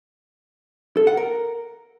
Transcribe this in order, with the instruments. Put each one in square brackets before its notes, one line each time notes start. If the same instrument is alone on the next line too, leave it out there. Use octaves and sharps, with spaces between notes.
[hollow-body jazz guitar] A4
F#5
A#4